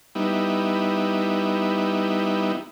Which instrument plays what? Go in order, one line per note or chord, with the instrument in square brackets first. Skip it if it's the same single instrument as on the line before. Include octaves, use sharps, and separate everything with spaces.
[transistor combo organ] G3 B3 D#4 E4